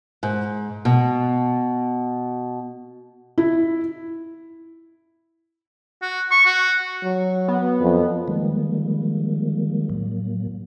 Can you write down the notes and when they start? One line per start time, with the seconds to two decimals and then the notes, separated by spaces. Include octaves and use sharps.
0.23 G#2
0.85 B2
3.38 E4
6.02 F#4
6.31 C#6
6.46 F#4
7.03 F#3
7.48 B3
7.81 F2
8.28 D#3 F3 G3 G#3 A#3
9.89 A2 F#3 A#3